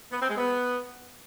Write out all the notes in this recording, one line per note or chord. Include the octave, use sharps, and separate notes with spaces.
B3
C4
G#3
B3